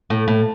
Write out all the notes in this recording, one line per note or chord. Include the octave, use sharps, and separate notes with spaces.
A2
A2